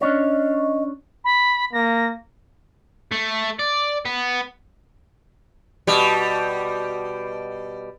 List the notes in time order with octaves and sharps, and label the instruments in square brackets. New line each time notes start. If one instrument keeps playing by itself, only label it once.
[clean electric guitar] C#4 D4 C#5 [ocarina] D#5
[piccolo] B5
[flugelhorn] A#3 [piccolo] A#6
[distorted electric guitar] A3
D5
B3
[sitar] B2 G3